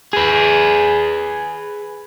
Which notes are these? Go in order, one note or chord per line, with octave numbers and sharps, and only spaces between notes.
G#4 B4